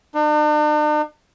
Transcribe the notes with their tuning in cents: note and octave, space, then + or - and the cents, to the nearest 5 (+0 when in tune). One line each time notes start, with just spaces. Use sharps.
D4 +45